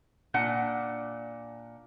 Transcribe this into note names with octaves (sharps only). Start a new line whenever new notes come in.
A#2 D4 F#5